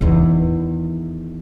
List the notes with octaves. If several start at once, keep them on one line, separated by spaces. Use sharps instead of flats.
E2 D#3